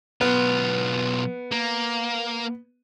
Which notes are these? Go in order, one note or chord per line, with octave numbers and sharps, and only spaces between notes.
B1 B3 F4
A#3